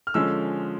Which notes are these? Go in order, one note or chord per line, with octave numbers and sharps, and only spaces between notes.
F6
D3 F3 G#3 C#4 E6